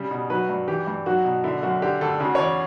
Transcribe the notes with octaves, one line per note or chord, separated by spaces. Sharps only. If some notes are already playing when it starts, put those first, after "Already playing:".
Already playing: C#3 G3
B2
F#3 B4
G2
E3 G4
G2
F#3 F#4
B2
D3 E4
F#2 F#4
D3 G4
D2 A4
C#3 F#4
C#5
E2 D5